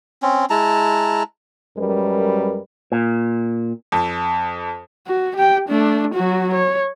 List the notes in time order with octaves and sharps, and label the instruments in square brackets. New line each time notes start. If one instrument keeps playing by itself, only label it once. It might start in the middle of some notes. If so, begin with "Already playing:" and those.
[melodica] C4 C#4
G#3 E4 A5 A#5
[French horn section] F#2 G3 G#3 A#4 B4
[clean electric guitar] A#2
[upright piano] F2
[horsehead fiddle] F#4
G4 G5
A3 D4
F#3 F#4
C#5